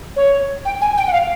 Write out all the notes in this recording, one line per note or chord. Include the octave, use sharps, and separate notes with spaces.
C#5
G5
G#5
G5
F#5
F5